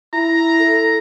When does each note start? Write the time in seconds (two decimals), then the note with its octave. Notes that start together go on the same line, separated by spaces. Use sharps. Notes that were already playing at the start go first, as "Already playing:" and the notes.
0.13 E4 A#5
0.59 A4